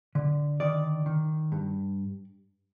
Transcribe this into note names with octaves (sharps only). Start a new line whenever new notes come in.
D3
D#3 D5
D#3
G2